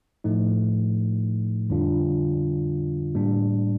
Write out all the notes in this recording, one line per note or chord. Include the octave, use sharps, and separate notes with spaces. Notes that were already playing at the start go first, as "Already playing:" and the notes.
A2 F3 A3 D#4
F2 D3 G3 D4 F4
A2 G3 A#3 D4